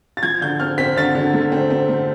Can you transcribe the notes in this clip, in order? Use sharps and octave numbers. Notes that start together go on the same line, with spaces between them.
A6
F3 G#6
D3 G6
C4 F6
C4 B6
D3 A6
D3
A3
C4
C4
A3